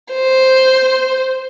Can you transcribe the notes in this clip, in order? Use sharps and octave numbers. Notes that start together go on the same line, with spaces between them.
C5